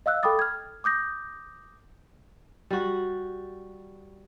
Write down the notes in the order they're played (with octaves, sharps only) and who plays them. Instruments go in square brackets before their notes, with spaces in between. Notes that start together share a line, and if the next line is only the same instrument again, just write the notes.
[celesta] D#5 F5 E6 F#6
A4 G5 B5 D6 D#6 A6
F6 G#6
D6 D#6 G6 A#6
[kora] G3 F#4